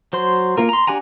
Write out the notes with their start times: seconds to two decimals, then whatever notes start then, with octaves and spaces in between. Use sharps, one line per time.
0.13 F#3 C5 C6
0.58 A#3 F4 A#4
0.69 A#5 C6
0.87 D4 G4 F#5 G#5 A#5